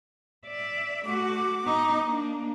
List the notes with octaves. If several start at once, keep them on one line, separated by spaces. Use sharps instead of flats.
D5 E5
A3 F#4 D6
B3 D#4
A#3 D4